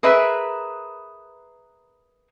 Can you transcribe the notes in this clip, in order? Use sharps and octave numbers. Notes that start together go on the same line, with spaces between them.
G#4 A#4 B4 E5